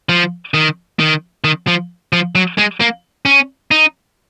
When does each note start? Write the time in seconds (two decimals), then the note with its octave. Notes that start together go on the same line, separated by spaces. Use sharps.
0.09 F3
0.54 D#3
0.99 D#3
1.44 D#3
1.67 F3
2.13 F3
2.35 F#3
2.58 G#3
2.80 A#3
3.25 C#4
3.71 D#4